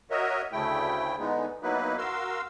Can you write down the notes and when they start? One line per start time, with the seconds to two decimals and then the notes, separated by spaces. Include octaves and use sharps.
0.11 F#4 A#4 C#5 D#5 E5
0.53 D2 C#3 A3 E4 G5
1.20 D3 E3 G#3 B3 D#4
1.63 F#3 A#3 B3 D#4 E4 B4
1.98 F#4 A#4 F5 C6 E6